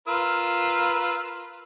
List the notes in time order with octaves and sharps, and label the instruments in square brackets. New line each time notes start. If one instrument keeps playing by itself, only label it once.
[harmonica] F4 B4 E6 [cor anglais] A#4